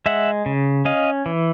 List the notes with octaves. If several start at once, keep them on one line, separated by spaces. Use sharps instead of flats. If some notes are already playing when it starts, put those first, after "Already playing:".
G#3 E5 F#5
C#3
C#4 D#5 F5
E3